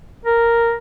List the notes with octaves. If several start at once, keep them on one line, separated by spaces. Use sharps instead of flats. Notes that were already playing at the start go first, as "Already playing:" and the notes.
A#4